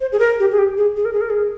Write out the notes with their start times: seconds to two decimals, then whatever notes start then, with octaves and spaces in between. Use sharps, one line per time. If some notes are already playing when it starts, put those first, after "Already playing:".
0.01 C5
0.12 G#4
0.19 A#4
0.40 G4
0.52 G#4
0.58 G4
0.77 G#4
0.97 G#4
1.05 A#4
1.13 G#4
1.21 A#4
1.30 G#4